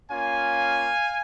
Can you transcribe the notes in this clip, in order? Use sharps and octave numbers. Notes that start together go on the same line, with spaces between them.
A#3 C#4 F4 F5 G#5